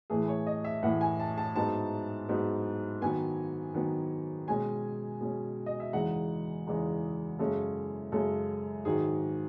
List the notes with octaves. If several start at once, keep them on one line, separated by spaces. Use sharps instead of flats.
A2 E3 A3 G#4
C#5
D#5
E5
A2 E3 A3 F#5
G#5
A5
A5
G#2 F#3 B3 D#4 A5
G#2 F#3 B3 D#4
D#3 F#3 B3 G#5
D#3 F#3 B3
B2 G#3 C#4 G#5
B2 G#3 C#4
D#5
E5
E2 C#3 G#3 D#4 F#5
E2 C#3 G#3 D#4
F#2 C#3 G#3 C#4 A4
F#2 C#3 G#3 C#4 A4
G#2 D#3 F#3 G#4